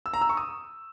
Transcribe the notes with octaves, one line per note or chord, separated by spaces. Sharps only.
E6
A#5
E6
C#6
D#6